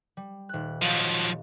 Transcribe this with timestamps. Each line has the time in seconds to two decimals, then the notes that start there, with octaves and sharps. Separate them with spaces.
0.17 G3
0.49 D#1 F#6
0.82 F3 F#3 D#5 F5